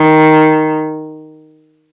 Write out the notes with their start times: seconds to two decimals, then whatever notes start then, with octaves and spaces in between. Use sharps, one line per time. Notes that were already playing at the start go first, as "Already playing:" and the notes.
Already playing: D#3